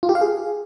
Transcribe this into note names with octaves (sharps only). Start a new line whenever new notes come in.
F4
G4
F5
G#4